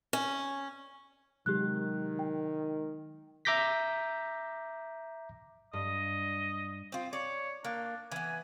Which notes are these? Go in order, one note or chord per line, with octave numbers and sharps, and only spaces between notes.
C#4
C3 D#3 F#3 G#3 G4 F#6
G5
E5 A#5 D6 G6 A#6 B6
G2 D#5
C4 F4
C#5 D5
A#3 D4
E3 B3 G#5